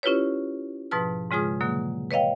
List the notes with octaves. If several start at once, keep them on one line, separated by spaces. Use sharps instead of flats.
C#4 E4 F4 G4 B4 C#5
G#2 B2 F3 B4 A5 F6
G#2 C#3 G#3 F4 G#4 D#6
B2 D3 F#3 A#3
B4 C#5 D#5 F5 G5